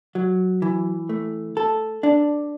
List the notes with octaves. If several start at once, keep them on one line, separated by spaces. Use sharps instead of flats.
F#3
E3
A3
A4
D4